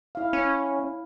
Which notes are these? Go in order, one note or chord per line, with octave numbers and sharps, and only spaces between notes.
E4 F5
C#4